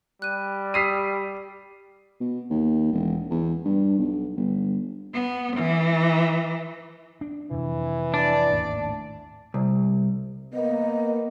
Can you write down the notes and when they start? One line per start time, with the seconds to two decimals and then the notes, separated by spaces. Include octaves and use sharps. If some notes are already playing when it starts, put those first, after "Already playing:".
0.22 G3 F#6 D#7
0.74 G4 D#6 E6 B6 C7 D#7
2.20 B2
2.50 D#2
2.93 E1
3.30 E2
3.65 G2
3.98 B1
4.36 G1
5.14 B3
5.56 E3
7.21 D4
7.51 F2 C3 E3
8.14 D4 D5
8.50 G#1 D#2 A2
9.54 C2
10.54 A#3 B3 D#5